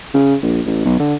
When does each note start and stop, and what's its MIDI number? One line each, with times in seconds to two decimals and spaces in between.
0.14 0.35 49
0.43 0.61 34
0.66 0.84 33
0.85 0.97 35
0.99 1.15 50